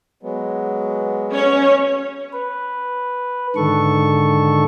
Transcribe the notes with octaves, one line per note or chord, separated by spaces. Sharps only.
F#3 G#3 B3
C#4 C#5
B4
G#2 D3 D#3 A4 C#6